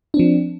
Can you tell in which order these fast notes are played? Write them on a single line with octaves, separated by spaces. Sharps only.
D4 C4 F3